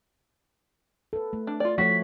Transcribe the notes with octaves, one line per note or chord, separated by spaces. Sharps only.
A4 B4
A3
D4
F4 D5
F3 A3 F#4 C#5 B6